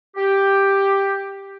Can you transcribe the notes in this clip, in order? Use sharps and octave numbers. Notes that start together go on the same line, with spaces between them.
G4